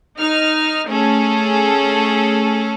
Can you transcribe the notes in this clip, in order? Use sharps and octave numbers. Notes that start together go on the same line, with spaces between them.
D#4 F6
A3 C#4 G#4 A4